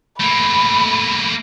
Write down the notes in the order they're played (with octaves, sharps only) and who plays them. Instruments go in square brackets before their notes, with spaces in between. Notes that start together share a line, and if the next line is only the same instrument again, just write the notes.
[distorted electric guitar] A3 A#3 [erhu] B5